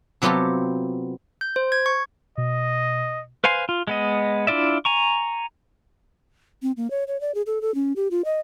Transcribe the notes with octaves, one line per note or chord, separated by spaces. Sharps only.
C3 F#3 B3 F4 G4 A4
G6
C5
G#6
C#6
B2 D#5
B4 C5 F5 G#5 C6
F4
G#3 B3 D#5
D4 E4 F4 D5 E5
G#5 A#5 C#6
C4
A#3
C#5
C#5
D5
G#4
A4
A4
C#4
G4
F4
D#5